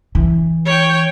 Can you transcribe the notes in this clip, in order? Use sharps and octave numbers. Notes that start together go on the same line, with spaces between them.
E3
C#5 G5